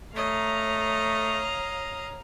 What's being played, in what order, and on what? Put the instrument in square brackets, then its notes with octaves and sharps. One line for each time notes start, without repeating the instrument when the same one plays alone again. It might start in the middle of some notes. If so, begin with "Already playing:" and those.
[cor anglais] A3 [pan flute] C#5 [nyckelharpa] D#5 [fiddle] F5 A#5